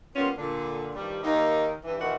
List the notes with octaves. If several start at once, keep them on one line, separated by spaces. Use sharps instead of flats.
G3 A#3 B3 C#4 F4
A#2 D3
G2 D#3 F3 G3
D#2 D#3 A#3 D#4
G2 E3
D#2 A#2 D#3 E3 F#4 F#5